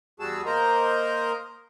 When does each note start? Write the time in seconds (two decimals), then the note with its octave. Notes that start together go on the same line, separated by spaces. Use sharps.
0.20 E2 G3 F#4 G#4 A5 E6
0.46 A#3 A#4 C5 D#5 A#5